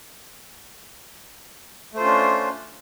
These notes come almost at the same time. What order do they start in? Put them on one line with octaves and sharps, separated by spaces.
A3 C5 F4 C#4 D4